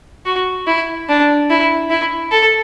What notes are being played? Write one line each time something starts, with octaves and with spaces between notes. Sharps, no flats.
F#4
E4
D4
E4
E4
A4